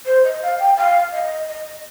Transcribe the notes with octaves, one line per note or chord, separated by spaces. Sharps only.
C5
D#5
F5
G5
F5
D#5
D#5